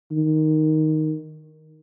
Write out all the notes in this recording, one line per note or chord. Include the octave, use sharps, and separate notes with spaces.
D#3